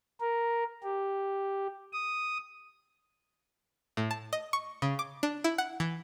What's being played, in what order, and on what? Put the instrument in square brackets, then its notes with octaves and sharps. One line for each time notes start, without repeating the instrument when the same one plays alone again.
[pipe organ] A#4
G4
D#6
[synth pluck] A2
A5
D#5
C#6
C#3
D6
D4
E4
F#5
E3